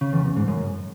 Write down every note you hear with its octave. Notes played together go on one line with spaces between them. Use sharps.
C#3
E2
E2
G#2
F#2